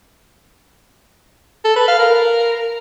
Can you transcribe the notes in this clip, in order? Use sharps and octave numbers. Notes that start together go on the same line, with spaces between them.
A4
B4
F5
A#4